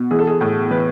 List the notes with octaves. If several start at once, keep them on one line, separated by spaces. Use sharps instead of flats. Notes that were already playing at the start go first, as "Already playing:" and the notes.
Already playing: B2
E3 G#4
A4
G#4
A2 G#4
E3 B4